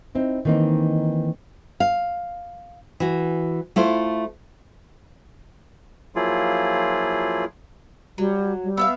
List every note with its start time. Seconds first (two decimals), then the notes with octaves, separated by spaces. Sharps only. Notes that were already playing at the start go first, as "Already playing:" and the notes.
0.15 C4 D#4 E4
0.45 D#3 E3 A#3 C4 D#4
1.80 F5
3.00 E3 F#4
3.76 A3 E4 F4 C5
6.15 F3 F#3 A#3 E4 F4 G#4
8.18 F#3 G3
8.64 G3
8.77 B3 E5 F5 E6